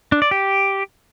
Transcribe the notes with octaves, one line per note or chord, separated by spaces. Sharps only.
D4
D5
G4